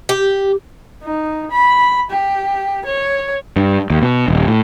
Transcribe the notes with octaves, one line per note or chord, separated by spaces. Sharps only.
G4
D#4
B5
G4
C#5
G2
D#2
B2
D#1
A2